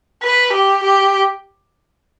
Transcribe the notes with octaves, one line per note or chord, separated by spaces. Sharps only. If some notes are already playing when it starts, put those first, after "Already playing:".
B4
G4
G4